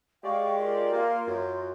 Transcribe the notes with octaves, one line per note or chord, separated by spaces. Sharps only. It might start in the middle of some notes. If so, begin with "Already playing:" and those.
G#3 G4 D5 F5 G5 C#6
F4 A#4 C6
A#3
F#2